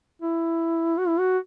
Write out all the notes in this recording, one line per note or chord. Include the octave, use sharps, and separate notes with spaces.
E4
F#4
E4
F#4